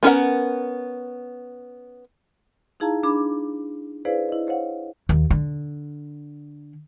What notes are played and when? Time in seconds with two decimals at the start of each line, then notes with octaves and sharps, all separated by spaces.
0.03 B3 C#4 A#4 F#5
2.80 D#4 E4 G#4 F5 A5 A#5
3.03 D4 G#4 B5 D6
4.05 E4 G#4 B4 C5 D5 F5
4.29 E4 D#5
4.47 C5 C#5 F5 F#5
5.09 D#2
5.31 D3